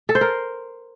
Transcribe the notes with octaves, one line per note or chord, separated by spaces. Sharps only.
A4
C5
A#4